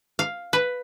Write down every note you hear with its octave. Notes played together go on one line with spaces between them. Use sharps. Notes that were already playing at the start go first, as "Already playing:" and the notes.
F5
B4